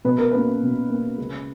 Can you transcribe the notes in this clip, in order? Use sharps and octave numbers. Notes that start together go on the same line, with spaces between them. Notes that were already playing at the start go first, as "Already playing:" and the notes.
B2 B4
A#4
A#3 C#4 B4
B2
A#3 C#4
C#2